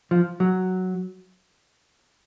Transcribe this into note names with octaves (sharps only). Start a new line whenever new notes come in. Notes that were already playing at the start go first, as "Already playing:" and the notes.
F3
F#3